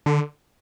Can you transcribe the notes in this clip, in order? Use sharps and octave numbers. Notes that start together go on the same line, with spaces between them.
D3